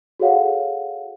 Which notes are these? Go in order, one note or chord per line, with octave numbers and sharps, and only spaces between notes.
F#4 G#4 A4 C#5 F5 F#5